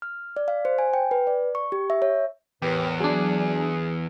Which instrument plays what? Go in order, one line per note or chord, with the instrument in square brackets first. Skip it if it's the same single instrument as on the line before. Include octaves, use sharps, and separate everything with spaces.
[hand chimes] F6
D5
F5
C5
G#5
G5
B4
D5
C#6
G4
E5
C#5
[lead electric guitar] E2 [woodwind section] A2 A#4 B4 [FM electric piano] G4
[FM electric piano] F#3 D4 [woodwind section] G#4